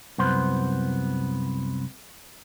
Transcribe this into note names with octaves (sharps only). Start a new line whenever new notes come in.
C2 F#2 B3 C5